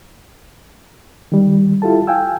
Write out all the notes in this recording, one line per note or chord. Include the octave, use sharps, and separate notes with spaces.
D#3 G3
E4 F4 G4 A4 A5
F5 G5 G#5 E6